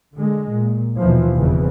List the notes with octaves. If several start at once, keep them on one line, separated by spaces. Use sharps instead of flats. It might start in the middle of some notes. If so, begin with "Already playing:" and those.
D3 G#3
A#2
D#2 B2 E3 F3
F1 E2 C#3 E3 F3